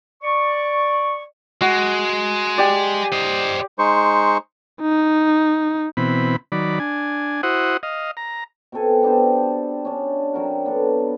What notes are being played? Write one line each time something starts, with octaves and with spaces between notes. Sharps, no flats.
D5 C#6
G#3 F#4
G4 D5
C5 D#5
G#3 D#4 C5 C#6
D#4
B2 E3 C4 B5
D#3 F#3 D5 B5
D4 G#5
E4 F#4 C5 F#5 D#6
D#5 F5
A#5
B2 C4 A4 G#5
B3 D4 G4 C5
C#4 D4
C3 F#3 A#4 F#5
B3 D4 A4